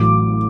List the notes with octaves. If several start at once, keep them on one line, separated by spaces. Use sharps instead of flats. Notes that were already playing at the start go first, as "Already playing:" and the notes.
Already playing: A1 A2 F#3 D6